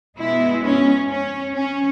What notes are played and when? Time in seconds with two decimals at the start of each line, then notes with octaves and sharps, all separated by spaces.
0.18 B2 G#3 B3 E4
0.63 C#4
1.09 C#4
1.54 C#4